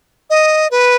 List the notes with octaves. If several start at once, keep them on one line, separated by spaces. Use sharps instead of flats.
D#5
B4